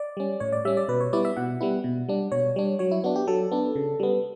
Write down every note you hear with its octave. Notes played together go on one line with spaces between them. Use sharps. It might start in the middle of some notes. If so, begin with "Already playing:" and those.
Already playing: D5
G3 C#4
A2 C#5
D5
G3 C#4 E5
D5
B2 B4
C#5
G3 B3 E4 D5
E5
B2 F#5
G3 B3 E4
B2
G3 D4
B2 C#5
G3 D4
F#3 C#5
E4
B3 D4 F#4
G4
F#3 A4
B3 D4
C#3
G3 B3